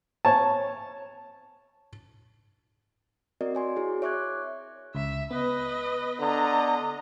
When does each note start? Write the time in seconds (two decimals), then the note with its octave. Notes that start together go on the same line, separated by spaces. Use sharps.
0.25 C#5 A5
3.41 C4 F#4 A#4 D5 D#5
3.55 C#5 G#5 C6
3.76 E4 F#4 G#4
4.02 C#5 E5 C#6 D6 F#6 G#6
4.95 C#2 E5
5.31 B3 B4 D#5
6.20 D3 D#5 A#5